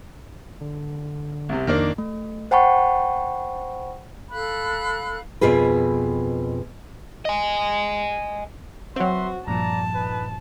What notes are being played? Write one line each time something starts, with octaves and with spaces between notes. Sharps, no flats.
D3
C2 C3
F2 D#3 A#3 D4
A3
C5 F#5 G5 A5 B5 C#6
A4 F5 B5 F#6
F2 B2 F4 G#4 B4
D#5 G#5
F#3 C4 F#4 B4 E5 C6
G2 A#2 F3 A#3 D5 A5 A#5
D#4 B4